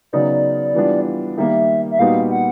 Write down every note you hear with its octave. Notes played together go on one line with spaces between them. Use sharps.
C#3 F#3 B3 D#4 D5
E3 G3 B3 D4 F4
D#3 G3 A#3 E5
E5
A#2 G3 B3 D#4 F#4 F5
F#5